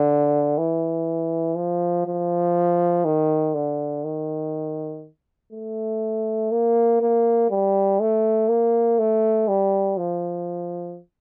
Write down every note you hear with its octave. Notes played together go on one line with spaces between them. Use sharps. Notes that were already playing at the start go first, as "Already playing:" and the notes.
Already playing: D3
E3
F3
F3
D#3
D3
D#3
A3
A#3
A#3
G3
A3
A#3
A3
G3
F3